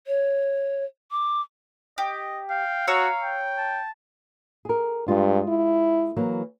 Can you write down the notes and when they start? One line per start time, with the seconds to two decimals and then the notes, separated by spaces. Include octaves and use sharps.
0.07 C#5
1.11 D6
1.98 G4 D#5
2.50 F5 G5
2.88 F#4 C#5 A#5 E6
3.23 G5
3.58 A5
4.65 G#4 A#4
5.08 G2 G#3 F4
5.48 E4
6.16 E3 F#3 A#3